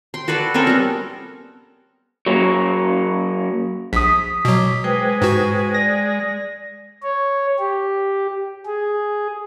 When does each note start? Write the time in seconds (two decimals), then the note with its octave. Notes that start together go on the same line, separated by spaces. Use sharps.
0.14 G5 C6
0.28 F#4 A4 B4 D5
0.54 C4 C#4 A4 A#4
0.67 G3 B3
2.26 F#3 A#3 C#4
3.93 A#1 D#6 B6
4.45 B2 F#3 D6
4.84 G#3 B4 C5 G5
5.22 G#2 F#4
5.74 D5 A#6
7.03 C#5
7.59 G4
8.66 G#4